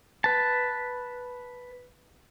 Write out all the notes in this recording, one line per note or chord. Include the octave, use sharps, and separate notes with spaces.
B4 A5